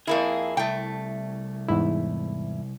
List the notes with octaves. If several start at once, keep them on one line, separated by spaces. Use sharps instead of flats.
F2 A#3 E4 G#4
C2 A3 G5
E2 G#2 E4